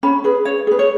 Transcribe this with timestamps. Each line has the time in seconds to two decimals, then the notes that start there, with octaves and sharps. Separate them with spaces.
0.03 C#4 B5
0.24 G#4 B4
0.45 C#4 C#5
0.67 G#4 B4
0.79 C#5